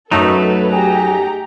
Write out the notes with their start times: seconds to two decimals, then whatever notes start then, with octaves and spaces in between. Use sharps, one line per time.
0.11 F#2 F#3 A3 D#4 A4 B4
0.72 G4 G#4 A#5